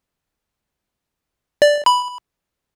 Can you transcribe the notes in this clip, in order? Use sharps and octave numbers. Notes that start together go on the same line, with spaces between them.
D5
B5